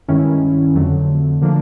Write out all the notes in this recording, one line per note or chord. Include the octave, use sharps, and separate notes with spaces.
G2 D#3 G#3 C#4 E4
F2 D3 F#3 A3
D3 F3 A#3 D4